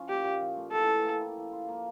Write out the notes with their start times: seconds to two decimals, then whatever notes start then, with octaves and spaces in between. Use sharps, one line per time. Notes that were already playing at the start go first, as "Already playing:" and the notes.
Already playing: F3 C#4 F4
0.08 A#2 G4
0.24 A#2
0.40 F3
0.57 A3
0.72 E3 A4
0.88 G4
1.05 A#3
1.20 E4
1.37 F3
1.53 F4
1.69 A#3